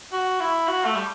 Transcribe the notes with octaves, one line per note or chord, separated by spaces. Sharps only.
F#4
E4
F#4
A3
G3